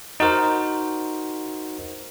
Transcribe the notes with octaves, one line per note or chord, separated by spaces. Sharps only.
D#4 F#4 A#4 C5